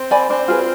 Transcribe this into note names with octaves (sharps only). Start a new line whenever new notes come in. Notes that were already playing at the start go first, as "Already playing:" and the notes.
Already playing: C4
D5 G#5 B5
C4 D4
F4 G#4 B4